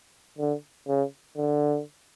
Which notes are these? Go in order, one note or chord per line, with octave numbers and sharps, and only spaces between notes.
D3
C#3
D3